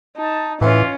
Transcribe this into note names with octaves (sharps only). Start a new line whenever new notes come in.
D#4 A5
A2 E3 C#4 F4